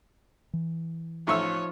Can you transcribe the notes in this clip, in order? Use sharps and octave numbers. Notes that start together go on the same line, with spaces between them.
E3
A1 F3 D#4 F4 C#5 C#6 E6